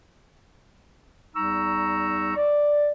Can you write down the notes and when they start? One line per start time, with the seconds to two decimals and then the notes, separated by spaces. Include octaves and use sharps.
1.36 E2 G3 D#4 A#5 C#6 E6
2.36 D5